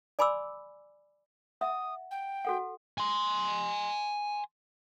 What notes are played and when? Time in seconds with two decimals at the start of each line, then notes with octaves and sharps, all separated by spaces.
0.19 D5 G#5 B5 C6 D6 E6
1.61 E5 F#5 D#6
2.11 G5
2.45 F#4 A4 F#5
2.98 G#5 C6